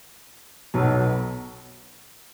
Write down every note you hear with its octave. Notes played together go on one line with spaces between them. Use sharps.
B1 B2 F#3